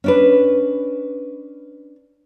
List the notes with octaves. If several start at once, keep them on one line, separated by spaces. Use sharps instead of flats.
C#4 D4 B4